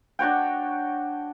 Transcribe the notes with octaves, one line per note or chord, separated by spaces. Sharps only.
D4 F#4 C#5 G5